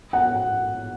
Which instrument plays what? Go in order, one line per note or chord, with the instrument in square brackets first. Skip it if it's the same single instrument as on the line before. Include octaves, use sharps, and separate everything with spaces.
[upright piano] F#5